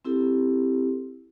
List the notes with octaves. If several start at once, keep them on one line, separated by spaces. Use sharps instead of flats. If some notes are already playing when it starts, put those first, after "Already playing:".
C4 E4 G4 A4